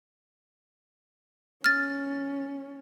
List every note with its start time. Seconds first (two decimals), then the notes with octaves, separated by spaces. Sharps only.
1.64 C#4 F6 A6